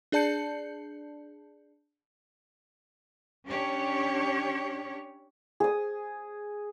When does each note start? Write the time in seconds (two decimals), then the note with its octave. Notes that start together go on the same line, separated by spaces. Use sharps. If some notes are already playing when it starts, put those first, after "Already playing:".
0.12 D4 G#4 D5 A5 G6 C#7
3.47 C#4 D4 G4 C#5
5.60 G#4 D#6